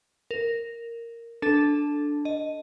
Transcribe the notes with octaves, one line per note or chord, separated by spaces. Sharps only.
A#4
D4 A4 A5
D#5